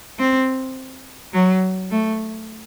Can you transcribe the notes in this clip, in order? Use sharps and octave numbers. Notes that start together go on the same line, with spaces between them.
C4
F#3
A3